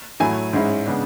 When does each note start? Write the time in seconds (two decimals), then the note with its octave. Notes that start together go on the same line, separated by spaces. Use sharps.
0.20 A2 F#3 A3 E4 G#5
0.53 G#2 G#3 C#4 E4
0.87 C#3 G#3 B3 D4